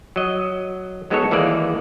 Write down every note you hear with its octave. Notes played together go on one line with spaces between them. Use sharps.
F#3 D#5
F#3 G#3 B3 D#4 A4 C#5
D#2 E3 G#3 A#3 D5 A#5